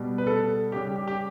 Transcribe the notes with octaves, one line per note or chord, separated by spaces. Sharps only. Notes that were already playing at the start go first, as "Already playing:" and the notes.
Already playing: B2 G3
B4
A4
C#3 G3 G4
G4
G4
G4